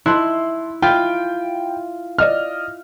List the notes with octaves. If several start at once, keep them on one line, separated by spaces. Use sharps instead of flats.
E4 A5 C6 F#6
F4 G5 B5
D5 D#5 F6